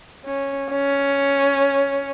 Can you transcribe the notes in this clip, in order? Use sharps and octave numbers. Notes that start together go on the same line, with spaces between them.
C#4
C#4